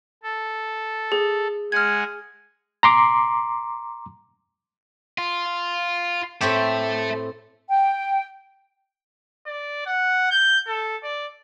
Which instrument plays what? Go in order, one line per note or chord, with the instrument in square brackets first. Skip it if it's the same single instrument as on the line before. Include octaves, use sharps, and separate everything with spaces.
[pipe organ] A4
[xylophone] G#4
[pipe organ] G#3 F#5 G#5 [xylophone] F6 G#6
[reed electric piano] A#5 C6 D6
[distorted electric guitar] F4
[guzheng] A2 C4 G4 [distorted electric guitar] A4 E5
[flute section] G5
[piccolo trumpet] D5
F#5
G6
A4
D5